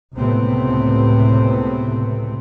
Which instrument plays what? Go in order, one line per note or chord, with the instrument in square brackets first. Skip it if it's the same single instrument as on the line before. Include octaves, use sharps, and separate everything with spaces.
[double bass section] C#2 A2 C3 A3 B3 C4